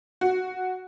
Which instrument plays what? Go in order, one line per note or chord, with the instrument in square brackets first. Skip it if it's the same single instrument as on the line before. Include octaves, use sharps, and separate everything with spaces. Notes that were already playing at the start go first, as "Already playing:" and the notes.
[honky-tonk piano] F#4